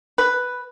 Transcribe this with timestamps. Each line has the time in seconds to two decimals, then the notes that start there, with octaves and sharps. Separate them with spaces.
0.18 B4